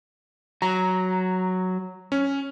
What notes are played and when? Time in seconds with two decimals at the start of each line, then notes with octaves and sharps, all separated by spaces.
0.62 F#3 A#5
2.12 C#4